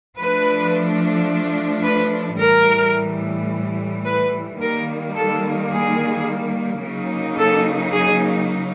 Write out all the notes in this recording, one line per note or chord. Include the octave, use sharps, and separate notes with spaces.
F3 A3 D4 B4
B4
A2 E3 G3 A#4
B4
D#3 G3 A#3 A#4
A4
G#4
C#3 F#3 A#3 D#4
A4
G#4